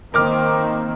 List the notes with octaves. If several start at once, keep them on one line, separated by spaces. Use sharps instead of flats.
D#3 A#3 C4 A#4 D6 F6